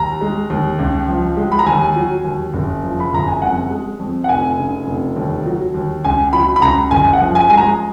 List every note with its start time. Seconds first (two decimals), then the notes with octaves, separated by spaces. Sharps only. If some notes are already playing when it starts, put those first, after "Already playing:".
Already playing: D#2 A#5
0.21 G#3
0.50 D#2
0.79 C#2
1.08 F3
1.37 G#3
1.52 B5
1.59 A#5
1.66 D#2 G#5
1.96 F#3
2.24 D#2
2.54 F#1
2.84 F3
3.00 B5
3.13 F#1 A#5
3.28 G#5
3.42 F2 F#5
3.70 G#3
3.99 F2
4.24 F#5
4.29 F1 G#5
4.59 C#3
4.87 F1
5.16 D#2
5.46 F#3
5.74 D#2
6.04 C#2 G#5
6.33 F#3 B5
6.56 B5
6.62 C#2 A#5
6.91 F#1 G#5
7.13 F#5
7.21 F3
7.35 G#5
7.50 G#3 G#5
7.57 A#5